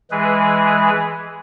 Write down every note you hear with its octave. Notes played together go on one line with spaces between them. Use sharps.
E3 G#3 G#4 B4